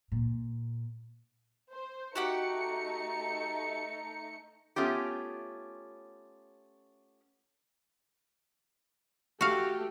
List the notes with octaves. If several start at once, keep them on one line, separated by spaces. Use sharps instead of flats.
A#2
C5
A3 D#4 F#4 G4 F#5 C#7
A3 B3 C#4 F4 G4
A3 F#4 G4 F5